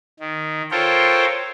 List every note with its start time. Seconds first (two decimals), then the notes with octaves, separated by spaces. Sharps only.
0.20 D#3
0.71 F4 A4 A#4 C5 C#5 G5